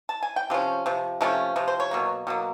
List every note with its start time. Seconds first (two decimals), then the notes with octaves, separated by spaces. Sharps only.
0.09 A5
0.23 G#5
0.36 G5
0.50 C3 F3 C#4
0.86 C3 F3
1.21 C3 F3 A3 C#4
1.56 C3 F3
1.68 C5
1.80 C#5
1.91 B2 F#3 A#3
2.27 B2 F#3 A#3